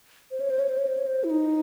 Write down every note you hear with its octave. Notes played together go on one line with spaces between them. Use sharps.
C5
C#5
C5
C#5
C5
C#5
C5
C#5
C5
E4
D#4